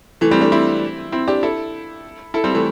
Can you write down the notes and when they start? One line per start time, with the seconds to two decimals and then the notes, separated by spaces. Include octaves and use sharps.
0.21 E3 A3
0.31 G3 C4
0.41 A3 D4
0.52 C4 E4
1.12 C4 E4
1.28 D4 G4
1.43 E4 A4
2.34 E4 A4
2.44 G3 C4
2.54 E3 A3